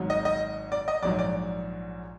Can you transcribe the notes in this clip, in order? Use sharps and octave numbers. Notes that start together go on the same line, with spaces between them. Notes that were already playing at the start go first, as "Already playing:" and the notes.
Already playing: G#1 G#2 F#3
D#5
D#5
D5
D#5
A#1 G#2 F#3 D5
D5